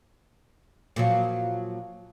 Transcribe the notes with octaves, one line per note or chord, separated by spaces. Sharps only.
A#2 F3 F#3